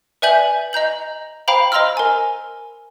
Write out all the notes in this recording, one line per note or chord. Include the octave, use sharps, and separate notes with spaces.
B4 D5 E5 G#5 G6 F#7
D#5 A#5 G6 F#7
C5 F5 G5 A#5 B5
C5 D#5 A#5 C6 E6 F6
A#4 G#5